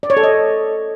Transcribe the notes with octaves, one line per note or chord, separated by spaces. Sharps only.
D5
C#5
A4
D#5